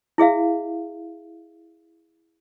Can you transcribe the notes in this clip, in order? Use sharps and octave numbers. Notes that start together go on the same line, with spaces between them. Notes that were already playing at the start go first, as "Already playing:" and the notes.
E4 G#4 E5 F5